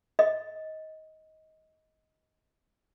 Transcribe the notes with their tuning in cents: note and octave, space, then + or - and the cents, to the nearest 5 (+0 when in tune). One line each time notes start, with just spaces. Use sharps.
D#5 +15